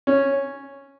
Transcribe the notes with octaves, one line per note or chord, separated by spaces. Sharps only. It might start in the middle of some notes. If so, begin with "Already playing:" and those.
C#4